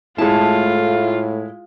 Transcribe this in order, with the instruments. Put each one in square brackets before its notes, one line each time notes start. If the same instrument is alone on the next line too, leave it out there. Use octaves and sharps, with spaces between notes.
[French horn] A2 [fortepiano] G#3 E4 [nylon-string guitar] A3 A5 [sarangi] F4